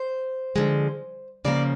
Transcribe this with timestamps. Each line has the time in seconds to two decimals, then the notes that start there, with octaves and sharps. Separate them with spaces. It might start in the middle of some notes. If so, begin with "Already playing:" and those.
Already playing: C5
0.56 D3 F3 G#3
1.45 C#3 F3 A#3 C#4 D5